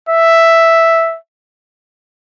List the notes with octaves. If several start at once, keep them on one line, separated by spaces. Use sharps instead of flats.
E5